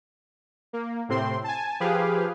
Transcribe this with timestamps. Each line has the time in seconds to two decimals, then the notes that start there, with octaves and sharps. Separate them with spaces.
0.73 A#3
1.09 A2 C3 C4 C6
1.44 G#5 A5
1.80 F3 G4 G#4 B4 F5